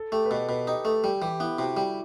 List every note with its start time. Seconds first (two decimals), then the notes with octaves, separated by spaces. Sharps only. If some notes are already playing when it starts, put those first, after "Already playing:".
Already playing: A4
0.12 A3 G4
0.25 B4
0.30 B2 A4
0.49 B2 B4
0.67 D#4 G4
0.85 A3 A4
1.04 G3 G4
1.22 E3 G4
1.40 B3 E4
1.58 C3 F#4
1.77 G3